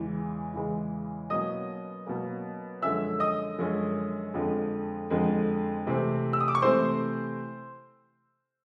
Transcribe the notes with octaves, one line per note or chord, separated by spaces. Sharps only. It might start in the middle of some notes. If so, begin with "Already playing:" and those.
Already playing: E2 C#3 E3 G#3
E2 C#3 E3 G#3
B2 F#3 A#3 C#4 D#5 D#6
B2 F#3 A#3 C#4
F#2 D3 F3 G#3 C#4 E5 E6
D#5 D#6
F#2 D3 F3 G#3 C#4
F2 D3 F3 G#3
F2 D3 F3 G#3
C3 E3 A3 C4
E6
D#6
D6
C#6
C3 E3 A3 C4 C5 C6